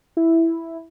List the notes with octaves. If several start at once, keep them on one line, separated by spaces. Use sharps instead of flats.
E4